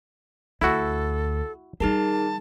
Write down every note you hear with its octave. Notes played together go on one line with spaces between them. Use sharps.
D2 E4 F#4 A4
D#3 G3 D#4 G#4 A#4 A5